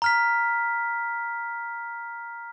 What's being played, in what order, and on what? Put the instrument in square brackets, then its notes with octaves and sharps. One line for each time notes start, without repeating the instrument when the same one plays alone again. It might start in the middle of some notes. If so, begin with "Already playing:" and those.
[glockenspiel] A#5 F6 B6